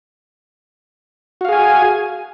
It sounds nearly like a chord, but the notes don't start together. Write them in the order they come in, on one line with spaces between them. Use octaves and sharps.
F#4 F5 G#4 G#5